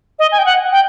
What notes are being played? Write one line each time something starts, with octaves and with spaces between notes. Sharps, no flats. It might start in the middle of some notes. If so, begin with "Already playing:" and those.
D#5
G#5
G5
F#5
G5